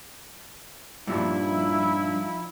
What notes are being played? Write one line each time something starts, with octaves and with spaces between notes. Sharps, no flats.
G2 A#2 F3 D#4 E4